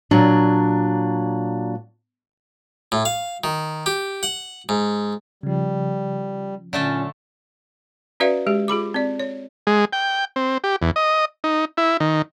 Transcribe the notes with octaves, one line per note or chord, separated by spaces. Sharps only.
A#2 F#3 D4
A2
F5
D#3
G4
F#5
G#2
C#3 F3 G3
A#2 D3 F#3 A3 C#4 A4
C#4 F#4 B4 D5 E5 F5
G#3 G4
F4 G#4 B5 D6
C4 D5
C#5
G#3
G5
C4
G4
E2
D#5
D#4
E4
D#3